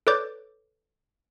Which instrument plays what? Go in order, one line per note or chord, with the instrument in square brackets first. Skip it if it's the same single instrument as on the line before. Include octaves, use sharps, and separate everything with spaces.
[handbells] A4 B4 C#5 D5 D6 G6